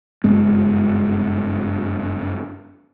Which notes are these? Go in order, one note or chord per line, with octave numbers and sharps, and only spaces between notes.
F#1 G2 G#3 B3